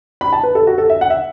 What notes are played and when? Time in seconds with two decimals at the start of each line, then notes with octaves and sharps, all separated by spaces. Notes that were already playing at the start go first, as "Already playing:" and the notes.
0.21 B5
0.33 A5
0.43 B4
0.55 A4
0.67 F#4
0.78 A4
0.90 E5
1.01 F#5
1.10 E5